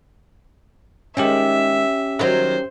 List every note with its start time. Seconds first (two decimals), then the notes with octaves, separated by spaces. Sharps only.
1.17 D#3 G#3 C#4 G4 E5
2.19 D#3 F#3 C5